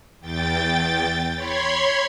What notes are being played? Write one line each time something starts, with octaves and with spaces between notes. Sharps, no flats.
E2 G5 A6
C#5 B5 C6 G#6